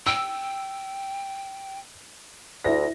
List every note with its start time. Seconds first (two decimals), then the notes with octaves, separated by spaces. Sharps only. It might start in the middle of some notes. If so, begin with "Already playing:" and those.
0.07 G5 E6
2.64 D2 E4 A#6